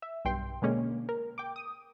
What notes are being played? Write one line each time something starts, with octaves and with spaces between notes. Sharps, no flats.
E5
B1 G2 G5 C6
B2 D3 G#3 A#3 C#4
A#4
G5 D6
D#6